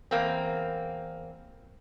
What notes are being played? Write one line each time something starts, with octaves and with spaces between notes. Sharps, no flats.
E2 A#3 C4